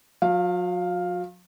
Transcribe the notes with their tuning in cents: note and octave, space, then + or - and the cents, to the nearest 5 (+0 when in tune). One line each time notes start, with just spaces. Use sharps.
F#3 -45 F5 +5